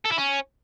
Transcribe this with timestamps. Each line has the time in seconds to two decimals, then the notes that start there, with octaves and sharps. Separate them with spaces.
0.06 A4
0.12 E4
0.18 C#4